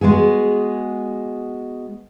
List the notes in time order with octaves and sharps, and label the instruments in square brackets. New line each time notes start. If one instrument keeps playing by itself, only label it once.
[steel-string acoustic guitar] G#3 B3 F#4 G#4